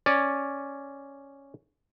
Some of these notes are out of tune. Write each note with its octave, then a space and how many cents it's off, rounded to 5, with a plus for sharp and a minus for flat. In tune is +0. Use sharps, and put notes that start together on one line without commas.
C#4 +0 D5 +0